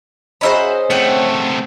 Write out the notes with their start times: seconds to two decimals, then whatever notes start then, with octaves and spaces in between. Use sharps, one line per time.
0.41 C#4 F#4 G#4 C5 D#5 E5 A#5 B5
0.90 C3 A3 F#5 G5